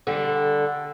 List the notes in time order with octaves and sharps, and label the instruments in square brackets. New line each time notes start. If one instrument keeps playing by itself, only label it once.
[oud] D3 G3